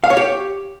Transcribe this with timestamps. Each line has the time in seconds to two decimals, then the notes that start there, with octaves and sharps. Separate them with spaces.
0.04 F5
0.10 C#5
0.17 G4